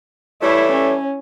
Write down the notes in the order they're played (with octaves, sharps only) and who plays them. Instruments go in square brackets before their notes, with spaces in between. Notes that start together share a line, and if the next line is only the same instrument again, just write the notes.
[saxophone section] E3 G3 A3 [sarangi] E4 [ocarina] C#5
[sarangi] C#4